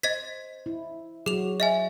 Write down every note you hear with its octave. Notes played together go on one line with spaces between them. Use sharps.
C5 D#5 G#6 B6
E4
F#3 F#4 G#4 F7
D#5 E5 G#5